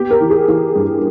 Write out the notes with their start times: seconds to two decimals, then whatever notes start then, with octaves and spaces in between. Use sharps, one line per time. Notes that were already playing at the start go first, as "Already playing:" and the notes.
Already playing: B3 G4
0.11 A#4
0.21 E3
0.30 G#4
0.48 E3 G4
0.75 G2